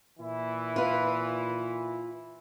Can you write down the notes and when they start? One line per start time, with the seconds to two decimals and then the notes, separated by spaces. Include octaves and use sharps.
0.19 A#2 E3 E4
0.76 F4 B4